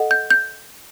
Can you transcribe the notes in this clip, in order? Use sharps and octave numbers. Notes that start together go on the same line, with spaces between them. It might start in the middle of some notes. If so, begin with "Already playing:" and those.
Already playing: A4 D#5 F#5
G6
G6